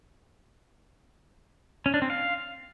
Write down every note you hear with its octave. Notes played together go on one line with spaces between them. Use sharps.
C#4
D4
C4
F5